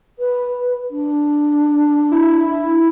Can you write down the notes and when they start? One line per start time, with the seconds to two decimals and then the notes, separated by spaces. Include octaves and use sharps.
0.19 B4
0.91 D4
2.11 E4